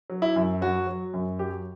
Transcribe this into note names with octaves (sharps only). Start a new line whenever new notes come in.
F#3
E4
F#2
F#3 F#4
F#3
F#2
F#3 G4